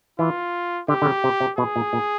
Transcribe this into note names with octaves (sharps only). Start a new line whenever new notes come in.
E3 F4
D3 G4
D3
C#3
C3
C3
B2 G#4
A#2
A#2